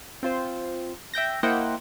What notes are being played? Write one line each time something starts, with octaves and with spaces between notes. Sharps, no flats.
C4 F4 C5
E5 G5 G6 A#6
A#3 E4 C5 D#5 F#5 G5